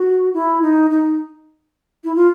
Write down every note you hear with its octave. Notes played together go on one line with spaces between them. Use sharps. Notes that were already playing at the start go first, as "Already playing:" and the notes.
Already playing: F#4
E4
D#4
D#4
E4
F4